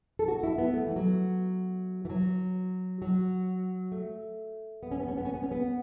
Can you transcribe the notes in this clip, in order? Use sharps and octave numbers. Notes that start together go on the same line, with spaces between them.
A4
F#4
E4
B3
A3
E3
F#3
E3
F#3
F#3
A3
B3
C#4
B3
C#4
B3
C#4
B3
C#4
B3